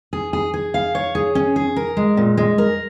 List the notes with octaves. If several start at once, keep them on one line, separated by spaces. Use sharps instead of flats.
G#4
G#4
G#4
F5
C#5
G#4
C#4
G#4
A#4
G#3
A#2
G#3
A#4